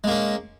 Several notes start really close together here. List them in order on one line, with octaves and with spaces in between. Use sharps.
G#3 A#3 C#4